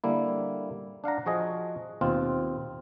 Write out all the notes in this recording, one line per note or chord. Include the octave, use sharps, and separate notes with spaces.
D3 G3 A#3 E4
D4 F5 F#5 A#5
F3 F#4 G#4 D#5
D#2 B2 C4 F4